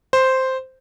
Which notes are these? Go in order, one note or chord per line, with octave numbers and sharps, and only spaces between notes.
C5